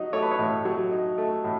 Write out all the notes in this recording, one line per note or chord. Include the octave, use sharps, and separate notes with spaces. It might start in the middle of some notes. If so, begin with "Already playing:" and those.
Already playing: F#3 D#4
A3 C#5
B4
C#5
A2
F#3
D#4
A3
A2